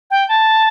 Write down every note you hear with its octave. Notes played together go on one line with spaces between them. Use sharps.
G5
A5